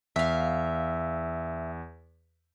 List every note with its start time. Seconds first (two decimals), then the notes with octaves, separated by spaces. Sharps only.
0.16 E2 E5 F5